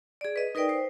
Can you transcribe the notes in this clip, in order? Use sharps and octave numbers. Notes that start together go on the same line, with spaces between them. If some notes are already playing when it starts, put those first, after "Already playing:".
G#4 D5
B4 D#5
D#4 A#4 B4 D5 G5
C5